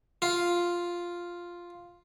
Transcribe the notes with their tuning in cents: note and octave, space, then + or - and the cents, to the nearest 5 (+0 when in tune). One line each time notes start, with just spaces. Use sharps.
F4 +0